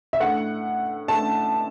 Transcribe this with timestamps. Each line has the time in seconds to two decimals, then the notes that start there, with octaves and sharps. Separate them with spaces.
0.13 E5
0.20 A2 A3 D4 F#5
1.08 A2 A3 D4 A5